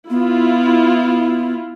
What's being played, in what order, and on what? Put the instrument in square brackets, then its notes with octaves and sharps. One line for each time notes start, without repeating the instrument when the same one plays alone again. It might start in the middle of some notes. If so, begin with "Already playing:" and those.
[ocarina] B3 [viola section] E4 F4